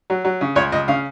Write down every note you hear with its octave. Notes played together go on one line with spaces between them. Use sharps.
F#3
F#3
C#3
C#2 C#5
C#2 D#5
C#3 F5